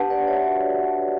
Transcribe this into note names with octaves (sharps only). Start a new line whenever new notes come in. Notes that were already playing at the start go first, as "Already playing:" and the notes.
Already playing: D4 G4 B4 F#5 A5
D4 B4 D5
C#5 E5
F#4